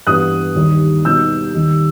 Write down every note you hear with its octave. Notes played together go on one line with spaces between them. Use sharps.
G2 E3 B3 D#6 F#6
D#2 D#3 G3
B2 G3 B3 D#4 E6 G6
D#2 D#3 G3